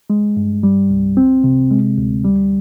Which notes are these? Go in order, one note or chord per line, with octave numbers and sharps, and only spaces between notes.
G#3
G2
G3
C2
C4
C3
G#3
D2
G3